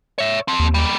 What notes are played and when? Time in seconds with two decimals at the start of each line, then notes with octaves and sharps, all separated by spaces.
0.18 C#5 E5
0.48 F3 C4
0.59 D#2
0.74 G3 A#3